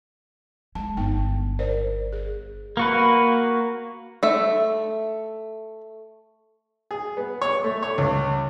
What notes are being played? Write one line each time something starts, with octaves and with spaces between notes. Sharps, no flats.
G#3 A5
G1 B3 D#4 G5
A#4 C5 D5
G#4
A#3 F#4 B4
A3 E5
G#4
B3
C#5
A3
C#5
C#2